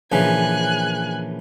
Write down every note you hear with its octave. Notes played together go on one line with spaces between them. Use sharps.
A#1 C#3 E3 G#5 F#6